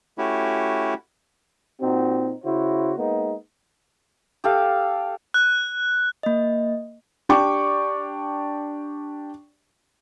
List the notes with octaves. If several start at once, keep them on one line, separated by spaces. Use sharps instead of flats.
A3 C#4 E4 F#4 G4
A#2 C4 D#4 F#4
C#3 E4 F#4 C5
G#3 A#3 B3 D#4
G4 A4 F5
F#6
A#3 D#5
D4 G4 D5 G5 C#6 D6